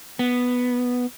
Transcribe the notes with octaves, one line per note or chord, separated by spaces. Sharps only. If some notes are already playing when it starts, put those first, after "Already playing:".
B3